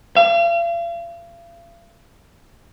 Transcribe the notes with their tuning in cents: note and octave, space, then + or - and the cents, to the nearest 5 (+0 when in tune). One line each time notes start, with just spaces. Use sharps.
F5 -40